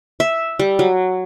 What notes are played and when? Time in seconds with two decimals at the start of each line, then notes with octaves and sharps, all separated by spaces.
0.20 E5
0.59 G3
0.79 F#3